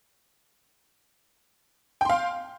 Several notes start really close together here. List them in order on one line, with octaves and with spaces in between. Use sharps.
G5 C6 F5